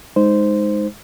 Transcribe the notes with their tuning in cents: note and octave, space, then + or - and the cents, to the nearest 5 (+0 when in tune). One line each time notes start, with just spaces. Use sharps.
G#3 +0 D#4 +0 C5 -10